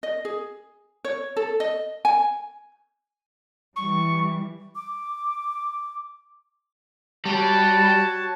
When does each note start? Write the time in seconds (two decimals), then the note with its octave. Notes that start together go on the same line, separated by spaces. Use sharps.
0.03 D#5
0.25 G#4
1.05 C#5
1.37 A4
1.60 D#5
2.05 G#5
3.76 E3 G3 C#6
4.75 D6
7.26 G3 F#4 C#5 A5